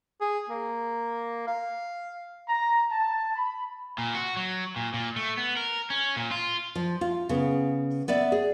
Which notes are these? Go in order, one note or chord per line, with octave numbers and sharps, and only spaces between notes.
G#4
A#3
F5
A#5
A5
B5
A#2
F#4
F#3
A#2
A#2
A3
B3
A#4
C#4
A#2
F4
F3
F4
C#3 B3
B3 D5 E5
G#4